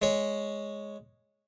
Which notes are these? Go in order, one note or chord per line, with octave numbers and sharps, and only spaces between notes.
G#3 C#5